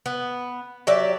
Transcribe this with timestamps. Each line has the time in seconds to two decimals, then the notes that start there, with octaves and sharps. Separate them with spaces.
0.06 B3
0.87 F#3 G4 D5 E5